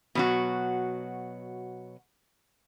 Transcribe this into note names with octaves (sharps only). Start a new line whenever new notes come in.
B2 F#3 F#4